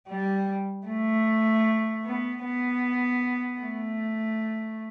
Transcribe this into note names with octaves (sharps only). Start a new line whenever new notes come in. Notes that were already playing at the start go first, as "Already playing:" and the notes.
G3
A3
B3
B3
A3